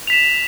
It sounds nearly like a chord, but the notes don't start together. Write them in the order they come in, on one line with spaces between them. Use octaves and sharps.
F7 B6 E7